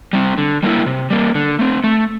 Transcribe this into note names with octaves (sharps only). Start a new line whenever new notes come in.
G3 C4
D3
G3 A#3 E4
C3
G3 A#3
D3
A3 C4
A3